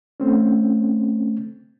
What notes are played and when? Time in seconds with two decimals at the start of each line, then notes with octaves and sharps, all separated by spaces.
0.20 A3 C4 C#4